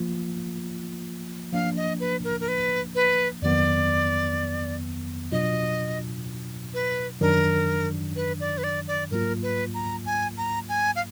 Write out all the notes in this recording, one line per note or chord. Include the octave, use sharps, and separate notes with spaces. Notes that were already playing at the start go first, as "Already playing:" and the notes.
Already playing: F3 A#3 F4
F3 A#3 D4 F5
D#5
B4
A#4
A#4
B4
B4
F2 D#3 F#3 B3 D5
B2 F#3 D4 F4 D#5
B4
F#2 D#3 F#3 D4 A#4
B4
D5
B4
D5
D5
G#2 F#3 A#3 F4 A#4
B4
A#5
G#5
A#5
G#5
F5